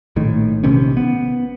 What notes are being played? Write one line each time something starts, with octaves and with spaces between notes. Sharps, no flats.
A#1 A2 D#3
A#1 C3 D#3 C#4
B3